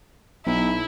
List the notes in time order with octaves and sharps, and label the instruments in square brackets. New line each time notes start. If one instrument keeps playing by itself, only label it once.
[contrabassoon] B1 [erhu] E4